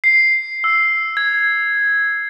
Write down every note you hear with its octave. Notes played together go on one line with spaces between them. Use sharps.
C7
E6
G#6